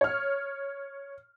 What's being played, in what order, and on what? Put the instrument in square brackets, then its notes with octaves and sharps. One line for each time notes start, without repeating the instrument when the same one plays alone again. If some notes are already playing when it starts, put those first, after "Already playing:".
[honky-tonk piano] C#5 F6